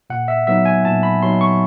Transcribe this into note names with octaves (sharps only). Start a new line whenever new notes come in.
A#2 F#5
E5
F#3 B3 D#4 E5
G#5
A#2 A5
B5
F#3 B3 D#4 C6
C#6